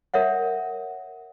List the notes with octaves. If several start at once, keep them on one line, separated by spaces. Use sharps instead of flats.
A#4 C#5 E5 F#5